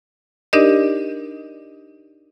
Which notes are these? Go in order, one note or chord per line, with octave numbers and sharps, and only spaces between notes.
D4 D#4 G4 A#4 D5 D#5